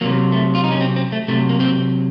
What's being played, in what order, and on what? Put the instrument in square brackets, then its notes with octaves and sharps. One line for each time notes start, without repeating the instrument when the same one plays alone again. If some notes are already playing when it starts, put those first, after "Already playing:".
[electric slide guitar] C3 F#3 A#3
A3
F4
D#4
C#4
C4
C4
A3
C3 F#3 A3
A#3
C4